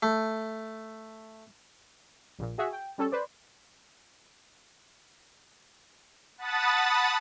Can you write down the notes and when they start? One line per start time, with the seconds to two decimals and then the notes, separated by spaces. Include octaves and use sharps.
0.03 A3
2.39 A#1 A#2
2.58 F#4 G#4 E5
2.73 G5
2.98 G3 C#4 A4
3.12 B4 C5 D5
6.38 F#5 A5 B5 D#6 A6